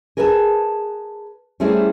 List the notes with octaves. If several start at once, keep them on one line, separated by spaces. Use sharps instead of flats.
G#4 A#4 B4 G#5 A5
G3 A3 C4 C#4 E4 G#4